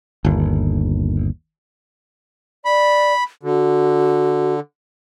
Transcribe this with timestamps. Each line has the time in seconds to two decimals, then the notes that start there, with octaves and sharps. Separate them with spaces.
0.25 G1 D#2
2.65 D5 B5
3.43 D3 F#4